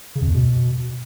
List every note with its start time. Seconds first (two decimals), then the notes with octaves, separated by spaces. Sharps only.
0.15 C#3
0.22 F2
0.28 E2
0.34 B2